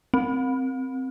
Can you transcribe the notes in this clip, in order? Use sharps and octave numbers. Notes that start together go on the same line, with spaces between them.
C4